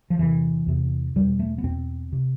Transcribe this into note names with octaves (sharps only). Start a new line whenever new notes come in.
F3
E2 C3 E3
E2 C3
E2 B2 G3
A3
B3
E2 B2 C4
C3